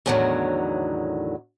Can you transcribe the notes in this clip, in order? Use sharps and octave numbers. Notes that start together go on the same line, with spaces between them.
E2 A2 D3 D#3 F3 F#3